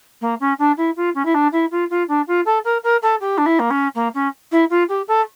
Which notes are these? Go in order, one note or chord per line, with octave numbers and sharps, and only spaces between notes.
A#3
C#4
D4
E4
F4
C#4
E4
D4
E4
F4
F4
D4
F4
A4
A#4
A#4
A4
G4
D4
E4
A#3
C#4
A#3
C#4
E4
F4
G4
A4